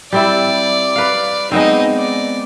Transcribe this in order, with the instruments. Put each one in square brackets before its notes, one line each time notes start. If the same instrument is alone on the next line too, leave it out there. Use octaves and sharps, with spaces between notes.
[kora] G3 C4 E4 [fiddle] D5
[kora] B4 F5
[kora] G#3 B3 C4 [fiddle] D#4 D#5
[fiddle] D5